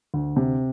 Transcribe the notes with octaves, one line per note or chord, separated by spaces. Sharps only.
D2
C3